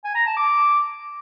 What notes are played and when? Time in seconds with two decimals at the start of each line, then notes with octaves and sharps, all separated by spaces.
0.04 G#5
0.15 A#5
0.26 A5
0.37 D6